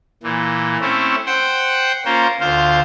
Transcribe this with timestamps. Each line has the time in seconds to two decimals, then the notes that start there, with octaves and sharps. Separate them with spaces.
0.23 A#2 E3
0.81 A3 C4 C#4 E4
1.26 C5 F#5 G5
2.05 A#3 C#4 F4 A#4 C5
2.41 D2 F4 C5 F5